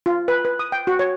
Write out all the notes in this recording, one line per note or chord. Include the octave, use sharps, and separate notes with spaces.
F4
B4
B4
D#6
G5
F#4
C#5